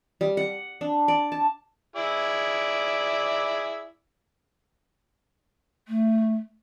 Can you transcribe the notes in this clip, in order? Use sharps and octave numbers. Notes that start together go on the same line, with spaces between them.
G3
F#5
D4
D5
A5
E4 G#4 D5
A3